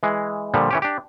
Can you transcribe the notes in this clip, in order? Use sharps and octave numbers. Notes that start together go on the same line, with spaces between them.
E3 G#3
A#2 D3 F3 G3
E3 C#4 G4
D4 G4